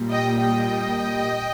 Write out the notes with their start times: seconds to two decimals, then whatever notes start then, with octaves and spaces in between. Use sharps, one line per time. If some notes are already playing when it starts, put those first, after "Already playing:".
Already playing: A#2 G3
0.10 D#5 G5
0.41 D#5 G5